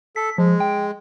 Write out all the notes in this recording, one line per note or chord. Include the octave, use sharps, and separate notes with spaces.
A4 B6
F3 G#3
G5